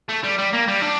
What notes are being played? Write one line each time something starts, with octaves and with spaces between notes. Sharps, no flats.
A3
G3
G3
A#3
G3
D4